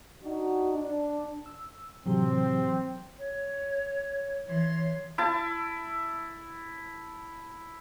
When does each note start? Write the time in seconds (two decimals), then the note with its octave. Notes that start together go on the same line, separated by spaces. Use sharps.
0.24 D4 D#4 F#4
0.73 D4
1.46 E6
2.06 A2 C3 E3 F#3 C4 G4
3.19 C#5
4.47 E3 C#5 C6
5.18 E4 A5